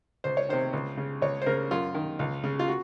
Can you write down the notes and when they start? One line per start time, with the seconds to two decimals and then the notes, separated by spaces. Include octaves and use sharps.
0.24 C#2 C5
0.37 C#5
0.49 C3 D#3 C5
0.73 C#2
0.97 C#3
1.22 C#2 C#5
1.42 C5
1.46 C#3 A#4
1.71 F#2 F4
1.94 D#3
2.19 C#2
2.44 C#3
2.59 F4
2.68 F#4